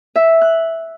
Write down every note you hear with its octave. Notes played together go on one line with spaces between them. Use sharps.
E5
F#6